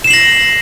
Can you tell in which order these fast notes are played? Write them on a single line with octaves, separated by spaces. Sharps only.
E7 C7 F#7 A#6